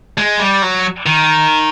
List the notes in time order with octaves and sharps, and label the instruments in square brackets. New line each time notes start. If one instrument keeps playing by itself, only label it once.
[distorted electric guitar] G#3
G3
F#3
D#3